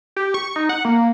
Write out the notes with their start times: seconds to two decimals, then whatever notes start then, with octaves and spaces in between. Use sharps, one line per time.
0.16 G4
0.34 C#6
0.56 D#4
0.69 F#5
0.85 A#3